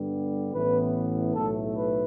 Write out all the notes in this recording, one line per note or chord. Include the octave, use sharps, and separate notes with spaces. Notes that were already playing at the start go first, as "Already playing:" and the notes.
Already playing: G2 D3 G3 B3
A1 A2 E3 B3 B4
B1 A2 A3 A4
B4